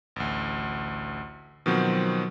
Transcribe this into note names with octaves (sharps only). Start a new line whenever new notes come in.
A1 D2
B2 D#3 F3 F#3 C4